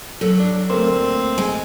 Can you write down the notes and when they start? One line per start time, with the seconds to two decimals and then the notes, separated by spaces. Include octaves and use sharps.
0.21 F#3 A4
0.39 D4
0.70 D2 A3 A#3 C4
1.38 G#3